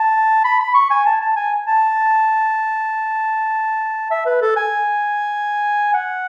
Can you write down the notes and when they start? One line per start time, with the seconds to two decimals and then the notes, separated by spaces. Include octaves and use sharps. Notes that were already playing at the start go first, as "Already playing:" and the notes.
Already playing: A5
0.44 B5
0.60 B5
0.74 C#6
0.91 G#5
1.06 A5
1.21 A5
1.36 G#5
1.67 A5
4.11 E5
4.26 B4
4.42 A4
4.56 G#5
5.94 F#5